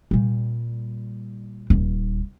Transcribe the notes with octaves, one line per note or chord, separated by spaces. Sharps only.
A#2 G3
D#1